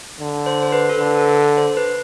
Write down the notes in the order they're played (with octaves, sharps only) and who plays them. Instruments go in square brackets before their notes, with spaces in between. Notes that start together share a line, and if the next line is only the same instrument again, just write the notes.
[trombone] D3
[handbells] C5
C5
B4
A4
[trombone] D3 [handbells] B4
[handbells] A4
A4
C5
B4